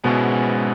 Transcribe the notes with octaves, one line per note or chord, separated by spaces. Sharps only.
G#2 B2 G#3 B3 C#4 E4